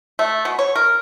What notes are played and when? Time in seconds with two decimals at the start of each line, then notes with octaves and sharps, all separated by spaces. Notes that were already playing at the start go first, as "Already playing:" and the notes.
0.19 A3
0.45 B2
0.59 C#5
0.76 A#4